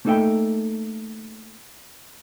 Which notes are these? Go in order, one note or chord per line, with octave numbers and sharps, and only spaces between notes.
A3 A#3 D#4 A4 E5 G5